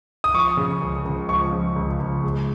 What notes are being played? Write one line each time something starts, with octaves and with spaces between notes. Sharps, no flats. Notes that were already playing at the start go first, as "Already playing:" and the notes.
D#6
F3 C#6
C#3
C#2
C#2
F3 C#6
C#3
C#2
C#2
G#3